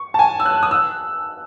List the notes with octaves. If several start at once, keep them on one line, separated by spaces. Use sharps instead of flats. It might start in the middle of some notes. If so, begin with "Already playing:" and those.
Already playing: C#6
A5
G#5
E6
F#6
D#6
E6